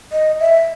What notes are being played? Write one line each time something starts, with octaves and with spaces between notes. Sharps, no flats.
D#5
E5